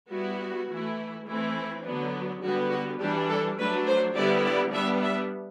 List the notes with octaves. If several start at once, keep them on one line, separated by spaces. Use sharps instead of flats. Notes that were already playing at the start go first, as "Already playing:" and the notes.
G3 B3 E4 F#4
E3 A3 E4
E3 A3 C4 E4
D3 F#3 B3 D4
D3 G3 B3 F#4
F#4
E3 G3 D4 G4
A4
F#3 A3 D4 B4
C5
D3 G3 B3 E4 D5
D5
G3 B3 D4 E5
E5